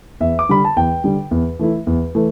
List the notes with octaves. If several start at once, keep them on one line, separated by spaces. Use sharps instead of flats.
E2 E5
D6
D3 G3 B5
A5
E2 G5
D3 G3
E2
E3 A3 E4
E2
E3 A3